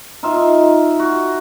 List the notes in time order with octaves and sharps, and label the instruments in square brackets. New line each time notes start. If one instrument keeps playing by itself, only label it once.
[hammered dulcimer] D#4 F4 E5
F#4